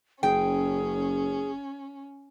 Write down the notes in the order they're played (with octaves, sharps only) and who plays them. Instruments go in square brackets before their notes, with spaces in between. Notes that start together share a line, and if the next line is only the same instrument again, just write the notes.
[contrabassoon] F#1 [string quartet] C#4 [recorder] G#4 [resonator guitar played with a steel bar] G5